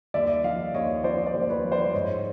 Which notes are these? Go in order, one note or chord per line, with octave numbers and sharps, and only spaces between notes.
D#2 D5 E5
F3 D#5 F5
D#2 C#5 D#5
F3 C5 D5
C5 D5
D#2
C5
B4 C#5
F3
C5 D5
G#2 C#5 D#5